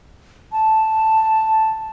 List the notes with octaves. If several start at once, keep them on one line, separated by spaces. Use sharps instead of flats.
A5